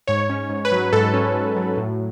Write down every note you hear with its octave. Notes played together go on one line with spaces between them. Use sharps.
G#2 C#5
C#4
G#2
B4
F#3
G#2 A4
C#4
G#2
F#3
A2